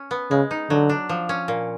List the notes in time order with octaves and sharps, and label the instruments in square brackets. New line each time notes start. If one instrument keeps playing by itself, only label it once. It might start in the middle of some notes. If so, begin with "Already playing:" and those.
Already playing: [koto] C#4
B3
[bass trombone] C#3 [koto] G#3
[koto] D#4
[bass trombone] D3 [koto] F#3
[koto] D4
F3
C#4
A#2